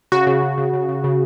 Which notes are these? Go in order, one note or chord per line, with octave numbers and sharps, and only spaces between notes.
C#3 F#4
C#3
C#3
C#3
C#3
C#3
C#3